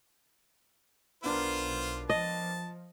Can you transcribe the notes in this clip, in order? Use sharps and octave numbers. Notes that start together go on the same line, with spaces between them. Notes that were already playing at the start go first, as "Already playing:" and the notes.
B1 B3 D4 F4 A#4 C5
F3 D#5 A5